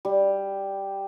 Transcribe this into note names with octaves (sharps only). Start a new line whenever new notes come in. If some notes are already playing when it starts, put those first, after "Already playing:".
G3